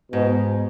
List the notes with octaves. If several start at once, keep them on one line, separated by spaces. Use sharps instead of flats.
G#2 B2